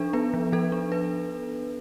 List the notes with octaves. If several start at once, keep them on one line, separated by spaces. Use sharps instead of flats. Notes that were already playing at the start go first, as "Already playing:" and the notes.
Already playing: F3 D4 A4
B3 B4
F3
F3 A4
D4
B4